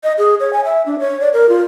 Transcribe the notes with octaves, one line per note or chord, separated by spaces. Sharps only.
D#5
G#4
C#5
G#5
E5
D4
C#5
D5
A#4
F4